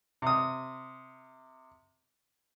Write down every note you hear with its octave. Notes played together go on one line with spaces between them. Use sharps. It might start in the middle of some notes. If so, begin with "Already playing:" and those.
C3 D#6